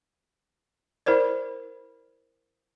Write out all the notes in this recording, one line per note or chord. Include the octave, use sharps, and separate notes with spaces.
E4 A#4 C5 D5